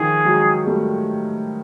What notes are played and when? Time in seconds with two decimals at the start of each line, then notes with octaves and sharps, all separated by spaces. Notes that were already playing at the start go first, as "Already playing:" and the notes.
Already playing: D#3 F3 G#4
0.25 F#3 G#3
0.66 G3 A3